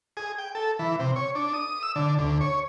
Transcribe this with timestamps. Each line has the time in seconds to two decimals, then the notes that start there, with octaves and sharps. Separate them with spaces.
0.17 G#4
0.38 G5
0.55 A4
0.79 E3
0.99 C3
1.16 C#5
1.35 D4
1.53 D#6
1.83 E6
1.96 D3
2.19 D2
2.41 C#5